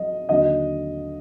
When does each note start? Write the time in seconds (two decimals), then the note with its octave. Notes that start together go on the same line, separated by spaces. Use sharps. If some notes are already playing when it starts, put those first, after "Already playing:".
Already playing: F#3 D#5
0.29 D#2 D3 F#3 D#5